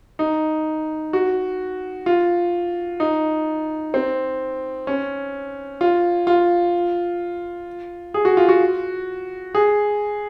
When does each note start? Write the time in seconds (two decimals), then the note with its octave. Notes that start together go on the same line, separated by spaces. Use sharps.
0.19 D#4
1.13 F#4
2.06 F4
3.00 D#4
3.94 C4
4.87 C#4
5.81 F4
6.27 F4
8.14 G#4
8.25 F#4
8.37 F4
8.49 F#4
9.55 G#4